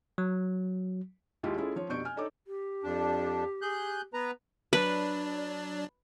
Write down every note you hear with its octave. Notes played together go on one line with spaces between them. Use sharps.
F#3
D#2 G#3 E4 F4 G4
G#3 C#4 E4 F4 G#4 A4
F3 C#5
F1 B2 D4 C#6 G6 D7
G#5 F6
D4 D#4 A4 C#5 D6
G4
F2 D4
G#4 F#6 G6
B3 B4 A#5
F#3 D4 B4 D5